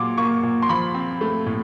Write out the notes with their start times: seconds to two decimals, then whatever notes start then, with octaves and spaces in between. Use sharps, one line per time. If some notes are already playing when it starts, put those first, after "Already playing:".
Already playing: A#2 F#3 C6 D6
0.18 A#3 C#6
0.43 A#2
0.62 C6
0.69 F3 B5
0.94 C4
1.21 A3
1.46 A2